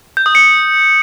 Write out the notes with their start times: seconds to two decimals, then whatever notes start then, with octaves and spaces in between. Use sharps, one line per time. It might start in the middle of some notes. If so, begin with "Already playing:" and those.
0.17 G6
0.26 D#6
0.35 C#7